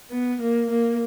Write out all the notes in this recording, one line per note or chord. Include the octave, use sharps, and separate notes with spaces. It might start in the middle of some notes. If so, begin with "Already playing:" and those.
B3
A#3
A#3